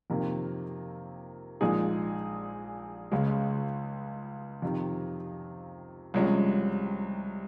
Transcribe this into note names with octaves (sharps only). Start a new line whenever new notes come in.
F2 C3 D#3 A#3
A#1 A#2 G#3 D#4 G#4
C#2 C#3 G#3
F2 C3 D#3
C2 C3 F3 G#3 C#4